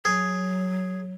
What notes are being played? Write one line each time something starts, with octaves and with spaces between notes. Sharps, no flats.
F#3 G#4